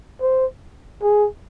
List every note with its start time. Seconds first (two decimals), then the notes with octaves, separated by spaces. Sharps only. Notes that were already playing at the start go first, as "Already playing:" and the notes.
0.22 C5
1.03 G#4